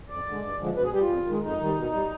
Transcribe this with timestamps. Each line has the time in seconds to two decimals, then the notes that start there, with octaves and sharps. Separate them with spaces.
0.09 F2 D5
0.26 D3 G#3
0.42 G2
0.59 D3 F3 G#3
0.75 B2 B4
0.84 G#4
0.93 G3 G4
1.01 F4
1.09 F2
1.26 D#3 G#3
1.43 F2 D#4
1.60 D#3 G3
1.76 B2
1.92 G3